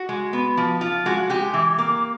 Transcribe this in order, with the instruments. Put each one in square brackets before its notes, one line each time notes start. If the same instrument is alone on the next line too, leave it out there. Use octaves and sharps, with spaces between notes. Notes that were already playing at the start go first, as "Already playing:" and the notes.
Already playing: [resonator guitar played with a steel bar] F#4
G#3
B3
F3
F3 F4
G#3 F#4
G#3 G4
E3
A#3